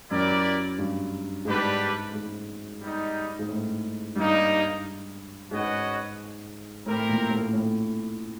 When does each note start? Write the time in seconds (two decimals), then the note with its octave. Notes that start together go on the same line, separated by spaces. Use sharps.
0.10 F#2 E4 G4 A#4 D5
0.78 G2
1.45 G#2 G3 B3 D4 G4 B4
2.13 G#2
2.81 G3 B3 D#4
3.39 G#2
3.49 A2
4.15 G2 G3 A#3 D#4
5.51 G#2 C#4 F#4 B4 D#5 F#5
6.86 A2 C4 E4 G4 A#4
7.09 A#2
7.30 A2
7.53 A2